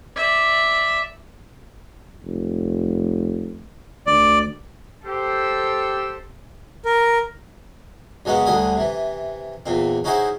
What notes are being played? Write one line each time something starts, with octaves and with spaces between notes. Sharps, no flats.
D5 E5
F1
D2 D5
G4 A4 C5 E6
A#4
F#2 C#3 F#3 G#3 B3 C#4
D2 D3 F#3 G3 G#5 D#6
C3 E3
E2 A#2 C4
C#4 D#4 E4 F#4 G#4 C5